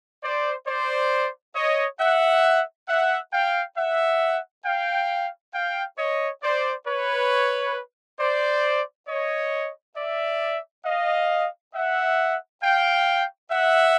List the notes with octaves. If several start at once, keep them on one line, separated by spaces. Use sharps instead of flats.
C5 D5
C5 D5
C#5 D#5
E5 F#5
E5 F#5
F5 G5
E5 F#5
F5 G5
F5 G5
C#5 D#5
C5 D5
B4 C#5
C5 D5
C#5 D#5
D5 E5
D#5 F5
E5 F#5
F5 G5
E5 F#5